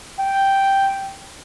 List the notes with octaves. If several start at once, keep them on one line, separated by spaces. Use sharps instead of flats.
G5